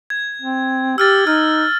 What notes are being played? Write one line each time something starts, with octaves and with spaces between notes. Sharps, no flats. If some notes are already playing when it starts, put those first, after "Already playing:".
G#6
C4
G4 E6 F6 A6
D#4 F6